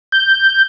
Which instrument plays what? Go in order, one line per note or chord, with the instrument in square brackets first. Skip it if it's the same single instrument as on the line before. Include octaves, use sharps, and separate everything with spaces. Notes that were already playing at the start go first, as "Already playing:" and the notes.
[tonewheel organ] G6